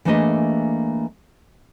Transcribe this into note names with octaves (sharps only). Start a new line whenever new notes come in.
E3 A3 A#3 D4 G#4 D#5